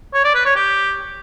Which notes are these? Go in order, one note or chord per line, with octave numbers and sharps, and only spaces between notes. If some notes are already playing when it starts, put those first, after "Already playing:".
C#5
D5
B4
C#5
G4